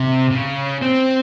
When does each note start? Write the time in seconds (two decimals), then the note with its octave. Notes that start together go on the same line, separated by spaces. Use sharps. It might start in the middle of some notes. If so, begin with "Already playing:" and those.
Already playing: C3
0.31 C#3
0.82 C4